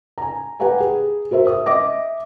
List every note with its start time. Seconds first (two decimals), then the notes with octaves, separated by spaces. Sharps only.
0.18 G#5 A#5
0.60 G4 B4 F#5 G#5 A#5
0.80 G#4
1.31 F#4 A#4 C5 E5
1.47 D#6
1.66 D#5 E5 D6 A#6